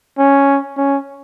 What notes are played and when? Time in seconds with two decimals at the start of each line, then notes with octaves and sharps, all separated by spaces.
0.18 C#4
0.77 C#4